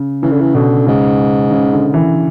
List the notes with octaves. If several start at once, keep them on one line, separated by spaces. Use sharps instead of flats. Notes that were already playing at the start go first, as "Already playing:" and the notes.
Already playing: C#3
C#3 E3
D3
E3
B2 D3
G#2 C#3
C#3
D3
E3